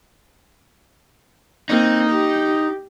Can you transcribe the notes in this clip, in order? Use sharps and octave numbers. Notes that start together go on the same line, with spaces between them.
A#3 C4 D#4
G4